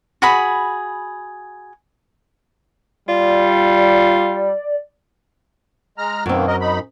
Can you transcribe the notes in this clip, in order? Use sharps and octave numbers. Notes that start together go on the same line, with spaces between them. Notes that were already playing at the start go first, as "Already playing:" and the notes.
F#4 G#4 B5
G3 F4 D5
G#3 A#5 F6
F#2 B2 D#3 A#3 C4
A#4 D#5
D#4 B5